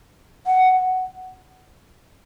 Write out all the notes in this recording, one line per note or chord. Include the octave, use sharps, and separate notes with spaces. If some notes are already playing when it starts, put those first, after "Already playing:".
F#5